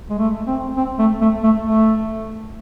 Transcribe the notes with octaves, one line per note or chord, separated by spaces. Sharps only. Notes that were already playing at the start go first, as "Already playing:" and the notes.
G#3
A3
C4
C4
A3
A3
A3
A3